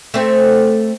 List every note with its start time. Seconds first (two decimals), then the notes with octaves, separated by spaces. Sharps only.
0.14 A3 C4